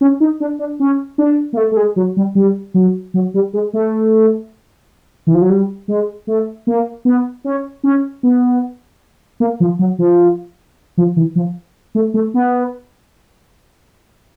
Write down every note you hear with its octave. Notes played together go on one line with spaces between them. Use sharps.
C#4
D#4
D4
D4
C#4
D4
A#3
A3
A3
G#3
F#3
G3
G3
F#3
F#3
G3
G#3
A3
E3
F3
F#3
G3
G#3
A3
A#3
B3
C#4
C#4
B3
A#3
F3
F#3
F3
F3
E3
F3
A3
A3
B3